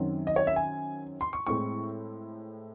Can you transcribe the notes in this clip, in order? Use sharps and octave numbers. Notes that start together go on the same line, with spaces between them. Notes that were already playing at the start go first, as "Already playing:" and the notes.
Already playing: F#2 D#3 F#3 C4
D#5
C#5
E5
G#5
C6
C#6
A2 G#3 C4 E4 C#6